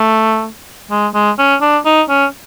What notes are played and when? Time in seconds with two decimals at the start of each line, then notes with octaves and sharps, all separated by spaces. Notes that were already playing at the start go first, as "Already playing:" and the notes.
Already playing: A3
0.91 G#3
1.14 G#3
1.39 C#4
1.61 D4
1.85 D#4
2.09 C#4